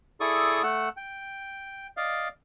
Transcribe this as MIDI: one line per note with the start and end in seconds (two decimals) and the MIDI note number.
0.21 0.62 64
0.21 0.62 68
0.21 0.62 69
0.21 0.62 74
0.21 0.62 85
0.21 0.62 87
0.63 0.89 57
0.63 0.89 78
0.63 0.89 88
0.97 1.87 79
1.97 2.28 74
1.97 2.28 75
1.97 2.28 77